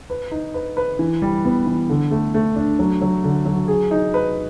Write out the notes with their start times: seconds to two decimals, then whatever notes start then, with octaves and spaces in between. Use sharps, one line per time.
0.10 B4
0.31 D#4
0.54 B4
0.77 B4
0.99 E3
1.22 G3
1.45 B3
1.66 E3
1.89 D3
2.11 A3
2.34 A3
2.56 D4
2.79 F#3
3.02 F#3
3.24 D3
3.45 F#3
3.68 G#4
3.91 D#4
4.14 B4